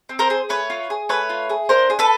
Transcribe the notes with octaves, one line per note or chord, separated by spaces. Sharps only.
C4
A#4 C5
G#4
A3 B4 C#5
F4
G#4
A3 B4 C#5
F4
G#4
D4 A#4 C5
G#4
A4 B4